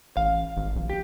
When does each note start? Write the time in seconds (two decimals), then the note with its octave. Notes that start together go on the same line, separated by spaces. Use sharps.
0.17 A1 F5
0.57 G#1
0.76 A#1
0.90 G4